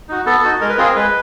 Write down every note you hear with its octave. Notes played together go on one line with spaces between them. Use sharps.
D#4 F#4
B3 A4
D#4 F#4
G#3 A#4
B4
C4 F4 G#4 A#4
G#3 B4